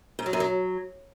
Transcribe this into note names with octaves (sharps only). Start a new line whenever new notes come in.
G#2
F#3
F#2
F#3